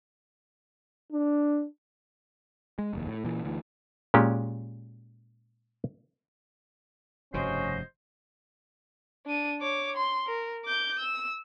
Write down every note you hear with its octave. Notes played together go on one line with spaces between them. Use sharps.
D4
G#3
F1 D#2
A2
A#2 E3
D2 E3
A#2 G#3 C#4 G4
F1 G2 C#3 C#4 F#4 C5 D#5
D4 D#7
C#5 D6
C6
A#4
D6 G6
E6